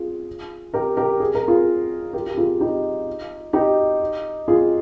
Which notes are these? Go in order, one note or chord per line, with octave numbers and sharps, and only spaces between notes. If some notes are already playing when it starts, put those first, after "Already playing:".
Already playing: F4 G#4
G4 A#4
G4 A#4
G#4
A#4
F4 G#4
G4 A#4
G4
F4 G#4
D#4 G4
D#4 G4
F4 G#4